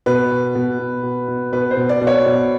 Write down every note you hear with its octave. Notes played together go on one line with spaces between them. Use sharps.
B2 B4
B2
B2
B2
B2
B2
B2 B4
C5
B2
D5
B2
C#5
B2